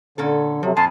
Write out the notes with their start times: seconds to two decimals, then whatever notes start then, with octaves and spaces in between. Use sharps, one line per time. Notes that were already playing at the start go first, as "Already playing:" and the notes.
0.18 A#2 D3 C#4 A4
0.63 C3 F3 F#3
0.76 F2 A#2 G#5 A5 C6